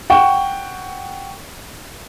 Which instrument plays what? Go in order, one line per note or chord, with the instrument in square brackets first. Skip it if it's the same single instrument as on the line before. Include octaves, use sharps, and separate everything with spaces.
[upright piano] F#5 G5 C#6